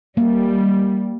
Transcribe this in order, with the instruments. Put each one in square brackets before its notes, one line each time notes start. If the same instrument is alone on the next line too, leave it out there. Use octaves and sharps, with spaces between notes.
[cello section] G3 [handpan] A#3